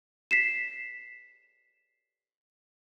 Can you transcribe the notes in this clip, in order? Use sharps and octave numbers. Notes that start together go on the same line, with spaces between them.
B6 C7 E7